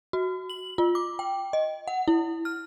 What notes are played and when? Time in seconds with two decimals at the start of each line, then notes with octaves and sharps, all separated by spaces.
0.13 F#4
0.50 F#7
0.78 F4
0.95 D6
1.19 G5
1.53 D#5
1.88 F#5
2.08 E4
2.45 F6